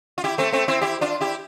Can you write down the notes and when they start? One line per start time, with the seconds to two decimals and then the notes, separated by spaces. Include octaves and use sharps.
0.18 F4
0.24 E4 G4
0.38 A3 C4
0.52 A3 C4
0.68 C4 E4
0.81 E4 G4
1.01 D4 F4
1.21 E4 G4